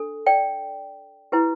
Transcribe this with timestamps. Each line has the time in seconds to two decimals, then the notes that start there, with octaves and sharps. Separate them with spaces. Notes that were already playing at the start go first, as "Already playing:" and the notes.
Already playing: D4 A4
0.26 D5 G5
1.32 E4 G4 B4